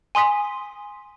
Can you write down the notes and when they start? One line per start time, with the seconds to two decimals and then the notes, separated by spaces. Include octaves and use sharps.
0.15 G#5 C6 D#6 B6